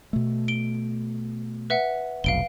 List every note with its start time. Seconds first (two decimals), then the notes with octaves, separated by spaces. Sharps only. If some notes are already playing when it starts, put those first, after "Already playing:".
0.13 B2 A3
0.48 D7 G7
1.70 B4 E5 F#5
2.24 F1 B1 F5 D7 G7